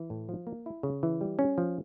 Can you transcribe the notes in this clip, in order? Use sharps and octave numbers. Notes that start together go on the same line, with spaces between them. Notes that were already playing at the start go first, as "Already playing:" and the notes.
Already playing: E3
A2
F3
A#3
E4
C#3
E3
G3
C#4
F3